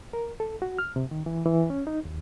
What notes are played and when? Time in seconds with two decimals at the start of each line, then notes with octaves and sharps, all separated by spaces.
0.13 A#4
0.40 A4
0.62 F#4
0.79 F6
0.96 C3
1.11 D#3
1.26 E3
1.46 E3
1.70 C#4
1.87 D#4
2.05 D#2